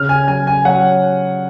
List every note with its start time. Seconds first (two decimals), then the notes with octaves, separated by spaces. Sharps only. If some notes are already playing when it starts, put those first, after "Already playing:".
Already playing: C#3 F6
0.09 G#5
0.27 F#3 G#5
0.47 G#5
0.65 F#3 F#5